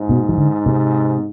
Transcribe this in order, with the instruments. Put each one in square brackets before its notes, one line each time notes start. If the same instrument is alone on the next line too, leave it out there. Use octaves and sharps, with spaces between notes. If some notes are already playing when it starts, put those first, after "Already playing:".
Already playing: [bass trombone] G#2
[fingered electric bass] B2
E3
D3
C3